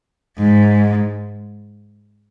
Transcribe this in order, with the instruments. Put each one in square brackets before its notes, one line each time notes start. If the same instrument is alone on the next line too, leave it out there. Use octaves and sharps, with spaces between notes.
[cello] G#2